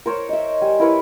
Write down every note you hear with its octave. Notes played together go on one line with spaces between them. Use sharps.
A#4 C5 C#5
D#5 E5
G3 G#5
E4 A#4 B4 C#5